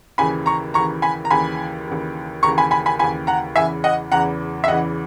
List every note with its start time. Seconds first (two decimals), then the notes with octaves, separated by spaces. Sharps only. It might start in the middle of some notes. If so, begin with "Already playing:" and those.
0.18 D#2 C#3 E3 G#5 B5
0.46 A#5 C#6
0.74 D#2 C#3 E3 A#5 C#6
1.02 G#5 B5
1.25 A#5
1.31 D#2 C#3 E3 G#5 B5
1.88 D#2 C#3 E3
2.43 D#2 C#3 E3 A#5 C#6
2.58 G#5 B5
2.71 G#5 B5
2.86 G#5 B5
2.99 D#2 C#3 E3 G#5 B5
3.27 F#5 A#5
3.56 E2 C#3 E3 E5 G#5
3.84 D#5 F#5
4.12 E2 C#3 E3 F#5 A#5
4.64 E5
4.68 E2 C#3 E3 D#5 F#5